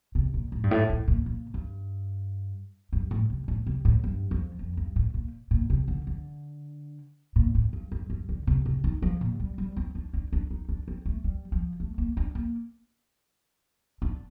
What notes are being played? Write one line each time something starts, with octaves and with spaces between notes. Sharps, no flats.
C3
A#2
A2
G2
A2
A2
A#2
A#2
G2
G2
A2
C3
A2
C3
A2
G2
F2
F2
G2
A2
A#2
A#2
C3
D3
D3
A#2
A2
G2
G2
G2
D3
C3
C3
D#3
F3
A#2
G3
G3
C4
D4
D4
D4
D#4
D4
C4
A3
G3
F3
A3
A#3
D4
A#3
D4